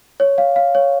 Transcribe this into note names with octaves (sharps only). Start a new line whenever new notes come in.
C#5
F5
F5
C#5